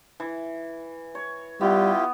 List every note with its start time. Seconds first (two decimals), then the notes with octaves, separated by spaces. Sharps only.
0.20 E3
1.15 C#5
1.61 G3 B3 E4 F4 G4